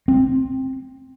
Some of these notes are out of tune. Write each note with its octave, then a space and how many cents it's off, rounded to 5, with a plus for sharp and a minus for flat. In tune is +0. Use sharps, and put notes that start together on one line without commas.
C4 +10